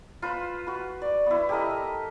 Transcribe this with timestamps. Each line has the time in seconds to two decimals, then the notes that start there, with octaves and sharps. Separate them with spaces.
0.22 F4 B4 C5 C6
0.67 F#4 B4
1.02 D5
1.26 B3 E4
1.49 G4 A4 A#4 D#5
1.71 D#5